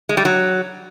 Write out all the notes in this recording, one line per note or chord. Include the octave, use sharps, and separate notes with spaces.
G#3
G3
F#3